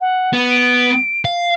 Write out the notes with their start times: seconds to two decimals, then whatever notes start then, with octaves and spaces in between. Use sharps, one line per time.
0.01 F#5
0.33 B3
0.50 D7
1.25 F5